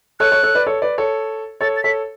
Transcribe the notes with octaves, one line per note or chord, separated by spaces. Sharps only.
A4 C#5 F#6
A4 C#5
A4 C#5
B4 D5
A4 C#5
B4 D5
A4 C#5
A4 C#5 A6
A6
A4 C#5 B6